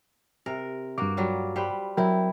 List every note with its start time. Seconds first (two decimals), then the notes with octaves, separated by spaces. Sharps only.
0.46 C3 A#4
0.98 G2 A#3 F#4 D6
1.17 F#3 G3 F4
1.56 G3 B4 C5
1.97 F#3 C4 E4 A#4 G5